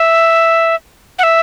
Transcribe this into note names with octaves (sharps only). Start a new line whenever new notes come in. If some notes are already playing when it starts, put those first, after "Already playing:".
Already playing: E5
F#5
E5